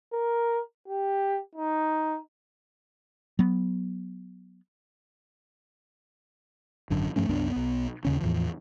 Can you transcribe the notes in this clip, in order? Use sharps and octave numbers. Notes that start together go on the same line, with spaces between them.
A#4
G4
D#4
F#3 B3
G#1 F#2 D3
G2 F3 A3 C#4
C2 F#2 B3 D4
B1 B3
D#2 C#3 C#4
E2 A2 E3 F3